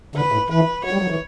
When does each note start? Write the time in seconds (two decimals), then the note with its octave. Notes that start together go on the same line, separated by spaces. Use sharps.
0.16 D3 B4
0.32 A2
0.50 E3 B4
0.84 F#3 C#5
0.93 G3
1.02 F#3
1.10 E3